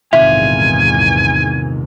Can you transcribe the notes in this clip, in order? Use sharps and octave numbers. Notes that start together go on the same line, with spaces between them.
A#1 E2 G#2 C3 D#3 F4 E5 G#5